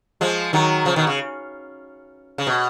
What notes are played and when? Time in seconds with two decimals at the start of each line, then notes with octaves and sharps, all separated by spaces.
0.21 F3 G#3
0.53 D#3 F#3
0.85 C#3 F3
0.96 B2 D#3
1.07 C#3
2.38 C#3
2.47 B2